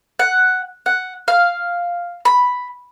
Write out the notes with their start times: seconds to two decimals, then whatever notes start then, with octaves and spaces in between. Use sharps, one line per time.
0.19 F#5
0.86 F#5
1.28 F5
2.25 B5